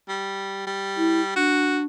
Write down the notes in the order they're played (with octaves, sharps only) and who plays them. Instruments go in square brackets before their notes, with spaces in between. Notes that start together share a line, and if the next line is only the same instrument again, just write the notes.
[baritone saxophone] G3
G3
[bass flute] E4
[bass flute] D4 [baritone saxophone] F#4